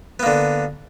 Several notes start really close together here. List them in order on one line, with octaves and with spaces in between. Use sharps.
B3 A#3 D3